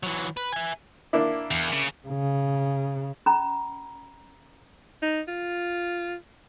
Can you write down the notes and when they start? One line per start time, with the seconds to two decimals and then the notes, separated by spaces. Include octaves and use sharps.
0.03 E3 F#3
0.37 B4
0.53 E5 G#5
1.13 A#3 D4 E4
1.51 E2
1.73 C#3
2.08 C#3
3.26 C#4 A#5 B5
5.03 D#4
5.28 F4